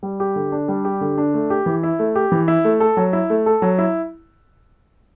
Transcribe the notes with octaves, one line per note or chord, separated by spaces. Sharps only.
G3
G4
D3
D4
G3
G4
D3
D4
A3
G4
E3
E4
A3
G4
E3
E4
A3
A4
F#3
E4
A3
A4
F#3
E4